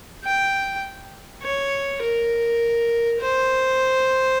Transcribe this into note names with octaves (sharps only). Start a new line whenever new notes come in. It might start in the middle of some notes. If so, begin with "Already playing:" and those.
G5
C#5
A#4
C5